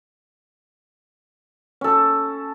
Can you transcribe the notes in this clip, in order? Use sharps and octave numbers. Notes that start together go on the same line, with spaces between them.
C#4 A4